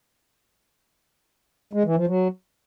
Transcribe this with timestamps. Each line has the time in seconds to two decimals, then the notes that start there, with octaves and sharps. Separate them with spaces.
1.73 G#3
1.84 E3
1.96 F3
2.07 F#3